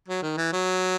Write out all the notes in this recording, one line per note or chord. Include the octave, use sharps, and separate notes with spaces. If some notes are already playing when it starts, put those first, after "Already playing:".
F#3
D#3
E3
F#3